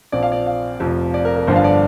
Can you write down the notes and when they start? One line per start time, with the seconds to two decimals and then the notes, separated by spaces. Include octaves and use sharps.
0.12 A#1 A#2 F3 C4 D5
0.23 F5
0.32 D5
0.46 F5
0.80 F1 F2 C3 F3
1.14 D5
1.25 A#4
1.36 A#4
1.47 G1 G2 D3 F3 D4 C5
1.56 F5
1.64 D5